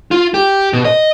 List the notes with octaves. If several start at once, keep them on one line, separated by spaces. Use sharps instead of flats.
F4
G4
B2
D#5